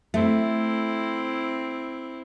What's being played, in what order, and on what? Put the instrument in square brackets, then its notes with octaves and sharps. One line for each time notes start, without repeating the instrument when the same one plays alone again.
[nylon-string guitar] A3 [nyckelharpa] C4 E4